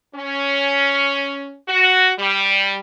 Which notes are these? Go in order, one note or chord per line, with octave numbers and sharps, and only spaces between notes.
C#4
F#4
G3